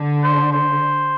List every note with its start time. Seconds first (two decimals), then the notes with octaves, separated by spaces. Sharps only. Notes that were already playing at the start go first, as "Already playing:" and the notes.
Already playing: D3
0.23 C5
0.53 C5